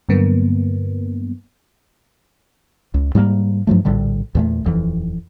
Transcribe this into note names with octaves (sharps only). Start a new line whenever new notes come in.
G2 D3 F#3 A#3 B3
C#2
G#2 G3 G#3 A#3
G2 F3 F#3 A3
A#1 A2 D3 G3
E2 A#2 A3
D#1 F2 E3